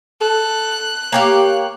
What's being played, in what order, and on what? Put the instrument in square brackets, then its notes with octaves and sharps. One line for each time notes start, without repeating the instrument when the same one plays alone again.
[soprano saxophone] A4 [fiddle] F#6
[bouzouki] A#3 G4 F5 [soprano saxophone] C#5